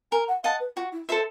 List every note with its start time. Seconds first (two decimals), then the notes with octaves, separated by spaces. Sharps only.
0.12 A#4 G#5
0.28 F#5
0.44 D#5 F5 F#5 A5
0.60 B4
0.76 F4 F#4
0.92 E4
1.09 F4 A4 C5 E5